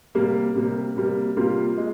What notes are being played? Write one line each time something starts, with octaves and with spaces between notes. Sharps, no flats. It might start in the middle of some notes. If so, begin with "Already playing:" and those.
C3 G3 A#3
C3 G3 A#3
C3 G3 A#3
C3 G3 A#3 F4
G#3